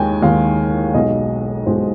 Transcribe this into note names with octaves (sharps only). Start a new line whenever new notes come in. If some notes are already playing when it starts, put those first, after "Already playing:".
Already playing: D#2 D#3 G#3 G5 G#5
D#2 D#3 G#3 F5
B1 B2 G#3 D#5
B1 B2 G#3 C5